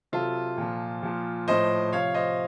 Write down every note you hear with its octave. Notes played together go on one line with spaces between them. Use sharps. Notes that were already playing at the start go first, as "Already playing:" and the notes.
C3 F#3 F4 A4
A#2 F3
A#2 F3
A2 F3 C5 D#5
C3 F3 C#5 F5
C5 D#5